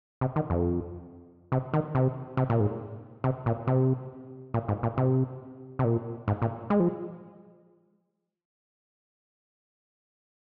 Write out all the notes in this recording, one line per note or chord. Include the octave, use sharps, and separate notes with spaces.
C3
D#3
F2
C3
D#3
C3
C3
A#2
G#2
C3
A#2
C3
A#2
G#2
A#2
C3
C3
A#2
G#2
A#2
G#3
F3